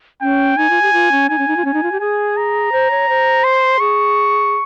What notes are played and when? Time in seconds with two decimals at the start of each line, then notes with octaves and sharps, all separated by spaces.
0.21 C#4 G5
0.57 D#4 G#5
0.70 F4
0.82 G4
0.93 F4
1.12 C#4
1.29 D#4 G#5
1.38 C#4
1.48 D#4
1.57 F4
1.65 C#4 G#5
1.74 D#4
1.83 F4
1.92 G4
2.00 G#4 G#5
2.37 A#5
2.72 C5
2.91 C#5
3.09 C5
3.44 C6
3.80 G#4 C#6